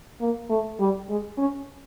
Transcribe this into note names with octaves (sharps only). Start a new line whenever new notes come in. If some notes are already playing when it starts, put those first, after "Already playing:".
A#3
A3
G3
G#3
C#4